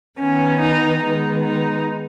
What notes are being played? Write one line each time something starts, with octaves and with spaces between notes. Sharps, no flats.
D#3 B3 C#4
D#4
D#3 G#3 B3 D#4
D#4